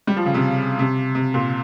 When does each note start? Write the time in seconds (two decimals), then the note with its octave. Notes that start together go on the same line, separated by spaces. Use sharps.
0.07 G3
0.17 F3
0.25 C#3
0.34 C3
0.79 C3
1.15 C3
1.34 A#2